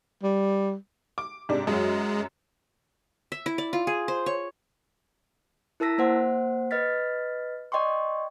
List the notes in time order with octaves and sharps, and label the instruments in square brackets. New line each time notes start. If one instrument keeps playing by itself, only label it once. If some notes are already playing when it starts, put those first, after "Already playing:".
[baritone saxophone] G3
[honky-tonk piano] D6
G#2 C3 D4
[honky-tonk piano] F#2 F#3 [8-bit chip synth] G#3
[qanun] E5
E4
D5
F4
G#4
C5
C#5
[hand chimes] E4 A#4 A5 E6 A#6 B6
A#3 C5 F#5
B4 D#5 F6 A6 B6
D5 D#5 G5 C6 C#6